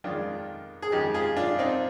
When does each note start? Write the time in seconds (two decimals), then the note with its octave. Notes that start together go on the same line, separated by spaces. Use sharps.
0.04 F2 D#3 G#3 D4 F4
0.82 G#4
0.92 F2 D#3 G#3 D#4 G4
1.14 F4 G#4
1.37 D4 F4
1.59 C4 D#4